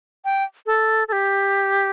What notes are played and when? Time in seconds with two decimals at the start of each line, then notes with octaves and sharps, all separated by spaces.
0.25 G5
0.66 A4
1.08 A4
1.12 G4